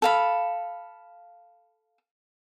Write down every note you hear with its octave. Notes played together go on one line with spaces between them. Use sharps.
A4 F5 B5